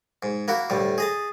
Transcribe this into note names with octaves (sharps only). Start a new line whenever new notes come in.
G#2
A#3 E4 F#4
D2 A2 G3
G#4 D#5 A5